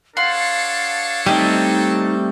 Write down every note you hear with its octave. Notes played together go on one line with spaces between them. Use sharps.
D4 A4 C#5 F5 F#5 C6
G3 A3 C4 D#4 G4 D#5